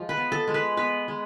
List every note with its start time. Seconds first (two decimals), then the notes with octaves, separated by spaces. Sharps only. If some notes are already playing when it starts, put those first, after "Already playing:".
Already playing: F3 G#3
0.09 B4
0.17 B3
0.32 A4
0.47 G#3
0.54 B4
0.77 B3 B4
1.08 G#3